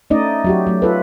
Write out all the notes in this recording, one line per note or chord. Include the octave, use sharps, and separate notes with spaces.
A3 C#4 D#4 D5 D#5
F#3 F#4 G4
F#3 A3
F4 A4 B4